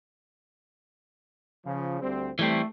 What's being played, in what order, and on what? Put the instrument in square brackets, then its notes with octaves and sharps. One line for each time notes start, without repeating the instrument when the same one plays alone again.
[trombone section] C#3 F3
D2 G3 C4
[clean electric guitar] E3 G3 C4 [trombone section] A3